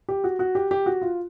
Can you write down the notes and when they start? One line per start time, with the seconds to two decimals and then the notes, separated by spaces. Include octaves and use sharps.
0.09 G4
0.24 F#4
0.39 F#4
0.55 G4
0.71 G4
0.86 F#4
1.02 F4